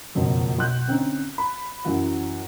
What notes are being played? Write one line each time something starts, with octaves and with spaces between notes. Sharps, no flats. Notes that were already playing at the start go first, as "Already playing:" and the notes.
F#1 B1 F2 F3 F#3
B1 C6 F#6 G6
D3 C4 C#4 D#4
B5
F#2 E3 F#3 F#5